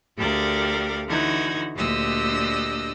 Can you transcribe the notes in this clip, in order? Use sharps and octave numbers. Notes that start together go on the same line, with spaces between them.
D2 G4 A4 A#4 D5 F5
D3 E3 D#4 F#4 G#6
D2 A#2 D4 G4 D#5 E6